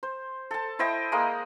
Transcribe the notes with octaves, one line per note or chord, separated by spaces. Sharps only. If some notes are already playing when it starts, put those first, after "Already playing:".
C5
A4 A5
E4 C5 D#5 G5
G#3 A#3 D#6